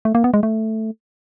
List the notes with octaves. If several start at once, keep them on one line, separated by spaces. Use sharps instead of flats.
A3
A#3
B3
G#3
A3